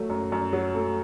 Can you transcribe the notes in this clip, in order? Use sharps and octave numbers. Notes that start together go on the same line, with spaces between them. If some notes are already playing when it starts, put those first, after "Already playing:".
Already playing: F#3 A3
F#2
F#2
F#3
A3